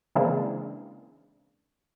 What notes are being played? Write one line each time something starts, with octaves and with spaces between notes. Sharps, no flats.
C#3 E3 G#3 A#3 C4 D4